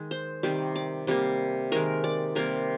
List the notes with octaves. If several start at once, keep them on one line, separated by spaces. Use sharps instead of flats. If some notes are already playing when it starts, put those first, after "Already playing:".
Already playing: D#3 G#3
C5
C3 D#3 G3 D5
D5
C3 G3 A#3
D#3 G#3 A#4
D5
C3 G3 A#3 A#4